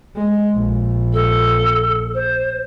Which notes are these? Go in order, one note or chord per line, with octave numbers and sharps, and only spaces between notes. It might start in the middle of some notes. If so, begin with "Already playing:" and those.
G#3
A#1
A4
C5